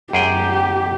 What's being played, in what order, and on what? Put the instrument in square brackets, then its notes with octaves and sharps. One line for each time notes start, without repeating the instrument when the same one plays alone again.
[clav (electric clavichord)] F#2 G#4 G5 [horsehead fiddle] G4